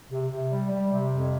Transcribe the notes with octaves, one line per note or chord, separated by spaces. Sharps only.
C3
C3
G3
G3
C3
F2